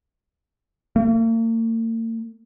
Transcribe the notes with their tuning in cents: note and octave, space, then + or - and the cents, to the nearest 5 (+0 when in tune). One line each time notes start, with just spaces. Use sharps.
A#3 -45